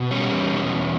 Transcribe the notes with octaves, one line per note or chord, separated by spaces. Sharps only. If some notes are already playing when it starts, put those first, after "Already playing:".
Already playing: B2
G3 C#4
E2
B2
E2